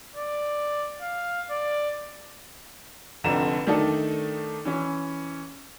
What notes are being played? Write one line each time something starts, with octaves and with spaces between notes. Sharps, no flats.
D5
F5
D5
F1 F2 D3 A#5 E7
D#3 A3 D4 D#4 A4
E3 C#4